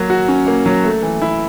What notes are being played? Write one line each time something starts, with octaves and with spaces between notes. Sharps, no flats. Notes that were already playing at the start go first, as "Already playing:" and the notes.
Already playing: F#3 A#3
F#4
C#4
A#3
F#3
A3
E3
E4